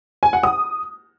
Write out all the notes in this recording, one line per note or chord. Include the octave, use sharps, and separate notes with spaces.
G#5
F#5
D#6